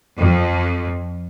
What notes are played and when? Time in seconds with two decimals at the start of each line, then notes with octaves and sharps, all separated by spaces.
0.19 F2